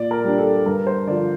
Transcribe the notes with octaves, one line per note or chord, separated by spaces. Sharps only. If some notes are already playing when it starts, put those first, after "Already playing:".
Already playing: A#2 D5
A#4
G3 D4
A4
G2 A#4
C5
D3 F3 D5